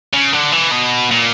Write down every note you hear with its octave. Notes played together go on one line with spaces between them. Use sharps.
C#3
D3
E3
B2
A#2